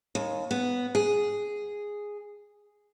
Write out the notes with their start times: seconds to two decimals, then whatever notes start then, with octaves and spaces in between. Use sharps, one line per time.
0.15 D#2
0.51 B3
0.95 G#4